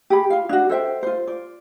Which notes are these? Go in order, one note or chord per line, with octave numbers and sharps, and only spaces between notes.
G4 G#4 B5
F4 F5
D4 F#4
A4 C5 E5 G5
F4 C5
D5